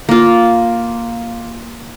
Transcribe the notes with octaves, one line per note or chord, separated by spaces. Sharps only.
A#3 F4